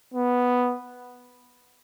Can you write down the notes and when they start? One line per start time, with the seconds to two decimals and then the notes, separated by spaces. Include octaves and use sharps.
0.14 B3